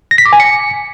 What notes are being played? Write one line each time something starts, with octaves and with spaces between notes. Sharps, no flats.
A#6
B6
D6
G#5
C#7